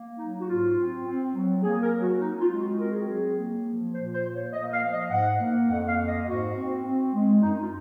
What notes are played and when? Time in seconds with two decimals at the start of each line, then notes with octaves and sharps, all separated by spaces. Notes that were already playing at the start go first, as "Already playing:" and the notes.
Already playing: A#3
0.18 F#3 D#4
0.40 F#4
0.47 G#2 F4
0.77 C4
1.06 C4
1.34 F#3
1.63 A#3 G#4
1.83 A#4
1.93 F#3
2.02 F#4
2.21 C4 D#4
2.41 F4
2.51 G#3
2.60 F#4
2.79 C4 A#4
2.90 G#4
2.99 F#4
3.08 F#3 G#4
3.37 A#3
3.66 F3
3.94 A#2 C5
4.14 C5
4.24 A#3
4.34 C#5
4.53 A#3 D#5
4.73 F5
4.83 F3
4.92 D#5
5.11 G#2 F#5
5.40 A#3
5.69 F2 F#5
5.88 F5
5.97 A#3
6.08 D#5
6.26 G#2 F#4
6.56 C4
6.85 C4
7.13 G#3
7.42 F#2 D#4
7.63 F4